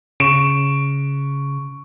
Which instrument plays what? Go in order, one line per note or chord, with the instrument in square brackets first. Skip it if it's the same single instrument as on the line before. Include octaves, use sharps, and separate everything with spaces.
[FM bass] C#3 [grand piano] C#6 D7 E7